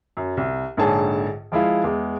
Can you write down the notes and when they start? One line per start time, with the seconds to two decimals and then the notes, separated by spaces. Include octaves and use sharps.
0.17 F#2
0.37 C2
0.77 A#1 G#2 D3 G#4 C#5 A5
1.52 F3 G#3 E4 F4
1.84 E2 G#3